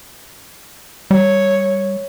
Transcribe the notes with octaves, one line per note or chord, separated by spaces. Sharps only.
G3 C#5